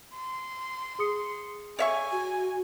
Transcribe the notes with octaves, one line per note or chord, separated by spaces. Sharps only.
C6
G#4 D#6 C#7
C#5 E5 G#5 C#6
F#4